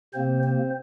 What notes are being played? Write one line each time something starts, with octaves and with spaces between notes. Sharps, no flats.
C3 A#3 C4 C5
C4 C5